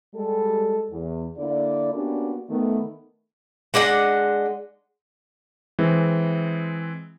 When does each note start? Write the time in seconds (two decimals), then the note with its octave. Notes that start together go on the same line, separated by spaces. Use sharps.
0.14 G3 G#3 A4
0.91 E2
1.37 D3 A#3 E4 D5
1.94 A#3 B3 C#4 D4 F#4 G4
2.49 D#3 A3 B3
3.74 G#3 D4 D#5 F#5
5.79 E3 G#3 C4